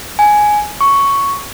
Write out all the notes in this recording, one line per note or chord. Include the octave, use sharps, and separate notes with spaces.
G#5
C#6